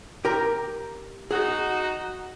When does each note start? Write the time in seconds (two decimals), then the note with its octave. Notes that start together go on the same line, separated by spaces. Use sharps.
0.25 G4 A#4 A#5
1.31 D#4 F#4 G#4